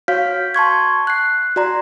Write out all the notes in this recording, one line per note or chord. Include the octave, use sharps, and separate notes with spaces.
F#4 C#5 F5 F6 G6 B6
A5 C6 C#6 G#6
F#6 C7
F#4 D5 A#5 C6